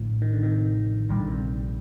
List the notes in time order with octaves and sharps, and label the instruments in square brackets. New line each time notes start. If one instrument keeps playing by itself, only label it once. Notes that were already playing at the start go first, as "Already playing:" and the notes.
Already playing: [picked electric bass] A1 A2 A3 [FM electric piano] D3 F3
[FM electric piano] D#3
D3
C3 D#3
[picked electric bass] A#1 A#2 G3 [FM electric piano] D#3
[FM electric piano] D3
C3 D#3